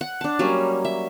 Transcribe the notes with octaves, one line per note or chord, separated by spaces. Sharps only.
F#5
D4 A5
F#3 G3 A#3 C#4
E5